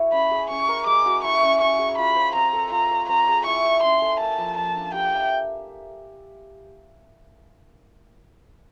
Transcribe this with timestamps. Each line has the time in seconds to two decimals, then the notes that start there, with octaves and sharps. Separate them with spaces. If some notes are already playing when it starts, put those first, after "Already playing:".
Already playing: E4 F#4 A4 C#5
0.12 C#4 B5
0.31 G#4
0.50 C#4 C#6
0.68 A#4
0.86 G#3 D6
1.06 F#4
1.24 E4 C#6
1.43 C#4
1.61 C#4 C#6
1.79 G#4
1.98 F4 B5
2.16 C5
2.34 C4 A#5
2.53 A4
2.72 F4 A#5
2.91 C#5
3.09 C4 A#5
3.28 G#4
3.46 E4 C#6
3.65 D5
3.83 C#4 C6
4.02 A4
4.20 A#3 A5
4.38 F3
4.57 F3 A5
4.76 D4
4.94 G4 G5
5.13 E5